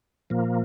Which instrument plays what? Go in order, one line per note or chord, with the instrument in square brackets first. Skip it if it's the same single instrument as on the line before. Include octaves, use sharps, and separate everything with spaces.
[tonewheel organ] A#2 F3 A#3